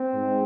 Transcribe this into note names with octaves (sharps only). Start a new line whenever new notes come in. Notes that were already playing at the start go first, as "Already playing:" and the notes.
Already playing: C4
G#2 G#3